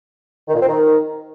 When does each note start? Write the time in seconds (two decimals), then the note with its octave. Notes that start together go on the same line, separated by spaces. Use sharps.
0.48 D#3
0.55 A#2
0.61 C4
0.68 D#3